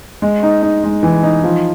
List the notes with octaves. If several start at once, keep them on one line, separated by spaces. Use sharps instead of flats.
G#3
D#4
D#4
G#3
E3
D#4
F3